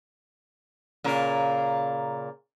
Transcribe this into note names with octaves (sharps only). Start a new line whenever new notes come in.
A#2 C#3 A#4